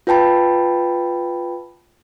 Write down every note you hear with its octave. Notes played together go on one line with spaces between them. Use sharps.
F4 B4 G5 A5 B5